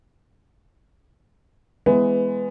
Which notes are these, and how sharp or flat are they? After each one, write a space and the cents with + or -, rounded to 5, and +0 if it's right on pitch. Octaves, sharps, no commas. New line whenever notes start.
E3 +0 G#3 +0 B3 +15